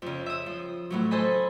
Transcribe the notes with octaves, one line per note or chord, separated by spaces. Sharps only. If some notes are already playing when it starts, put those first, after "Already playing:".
F2 C#3
E5 D#6
F3
A2 E3 F#3
A4 C5 D#5 G#5 B5